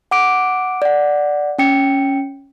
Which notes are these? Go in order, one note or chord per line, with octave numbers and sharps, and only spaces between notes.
F#5 D6 D7
D5 F#5
C#4 G5 C#7